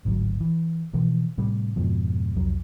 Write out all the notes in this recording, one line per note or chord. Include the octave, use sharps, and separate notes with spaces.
D1 G#1 D2 F#3
E3
B2 E3 F3
A2 C3 G3
F2 G#2 B2 F3
C2 F2 F#3